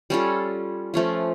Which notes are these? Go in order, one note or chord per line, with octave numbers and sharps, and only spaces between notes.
G3 C#4 F4 A4
F3 A3 C#4 F4